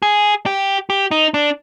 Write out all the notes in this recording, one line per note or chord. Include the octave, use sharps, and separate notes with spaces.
G#4
G4
G4
D#4
D4